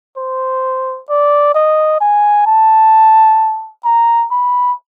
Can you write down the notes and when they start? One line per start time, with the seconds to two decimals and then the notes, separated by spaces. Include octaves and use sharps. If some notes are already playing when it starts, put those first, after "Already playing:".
0.17 C5
1.10 D5
1.55 D#5
2.01 G#5
2.46 A5
3.85 A#5
4.31 B5